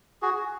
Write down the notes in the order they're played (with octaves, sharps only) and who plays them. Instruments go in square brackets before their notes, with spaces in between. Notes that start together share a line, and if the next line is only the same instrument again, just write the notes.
[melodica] F#4 G#4